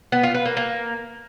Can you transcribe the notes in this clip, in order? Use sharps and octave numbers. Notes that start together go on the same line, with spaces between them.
B3
F4
B4
A#3
A#3